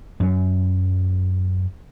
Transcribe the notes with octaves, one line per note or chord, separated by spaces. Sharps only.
F#2 F#3